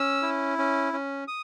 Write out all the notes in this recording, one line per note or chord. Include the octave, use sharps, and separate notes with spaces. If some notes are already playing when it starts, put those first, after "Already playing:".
Already playing: C#4 E6
E4
C#4
C#4
D#6